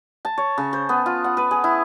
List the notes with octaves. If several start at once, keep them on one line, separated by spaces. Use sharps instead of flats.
A5
C#5
C#3
C5
B3
F4
F#5
B4
G#4
E4